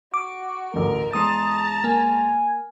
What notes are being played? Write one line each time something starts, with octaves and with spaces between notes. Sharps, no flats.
F#4 D6
A1 D2 A#4
E2 G#3 A5 A#5 C6 D#6
A#3 G#5